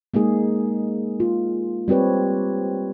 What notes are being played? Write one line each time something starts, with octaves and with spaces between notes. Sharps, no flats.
G#3 A#3 D#4 G#4
F4
G3 C4 G4 B4 C#5